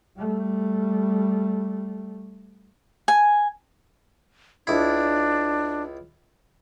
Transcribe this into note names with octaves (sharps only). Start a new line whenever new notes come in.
G3 A3
G#5
C#2 D4 E4